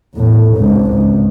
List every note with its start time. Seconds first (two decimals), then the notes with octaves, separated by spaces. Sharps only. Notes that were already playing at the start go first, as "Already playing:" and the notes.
0.15 E2 A2
0.55 G#1 C#2
0.92 C#2